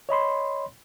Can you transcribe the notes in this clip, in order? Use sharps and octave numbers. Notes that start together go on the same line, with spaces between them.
C#5 D#5 B5 C6